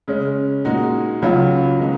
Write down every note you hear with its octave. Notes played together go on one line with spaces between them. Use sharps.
C#3 G#3 C#4
A#2 G#3 D#4 F#4
C#2 C#3 F#3 C#4 F4
D#3 G#3 B3 D#4